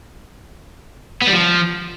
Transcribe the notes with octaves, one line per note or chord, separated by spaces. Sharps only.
B3
G3
F3